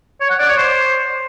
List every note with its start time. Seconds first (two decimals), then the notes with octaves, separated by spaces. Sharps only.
0.21 C#5
0.30 F#5
0.39 D5
0.49 C#5
0.58 C5